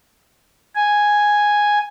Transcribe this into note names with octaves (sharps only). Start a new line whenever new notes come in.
G#5